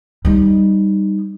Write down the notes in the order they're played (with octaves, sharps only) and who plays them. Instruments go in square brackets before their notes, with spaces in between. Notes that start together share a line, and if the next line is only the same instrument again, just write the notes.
[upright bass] G3 D#4